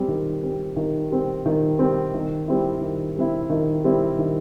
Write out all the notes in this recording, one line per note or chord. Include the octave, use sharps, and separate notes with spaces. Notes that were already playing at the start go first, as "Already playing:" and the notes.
Already playing: G3 C4
D#3
G3 C4
D#3
G3 C4
D#3
G3 C4
D#3
G3 C4 E4
D#3
G3 C4 E4
D#3
G3 C4 E4
D#3